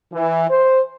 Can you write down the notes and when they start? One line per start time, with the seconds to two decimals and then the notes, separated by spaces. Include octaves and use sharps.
0.13 E3
0.50 C5